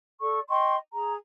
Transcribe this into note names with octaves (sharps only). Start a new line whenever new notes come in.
A4 D5 C#6
D#5 G5 C6 C#6
G#4 A#5